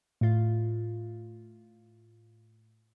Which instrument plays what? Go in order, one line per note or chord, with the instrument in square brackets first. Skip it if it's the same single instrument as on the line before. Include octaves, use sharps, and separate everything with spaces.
[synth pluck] A2 F4